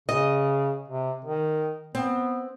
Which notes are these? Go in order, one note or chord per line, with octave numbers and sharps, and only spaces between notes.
C#3 D#5
C3
D#3
B3 C4